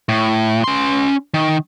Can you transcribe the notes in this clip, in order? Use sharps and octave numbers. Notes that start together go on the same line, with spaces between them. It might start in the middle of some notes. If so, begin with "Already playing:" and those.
A2
C#4 C6
D#3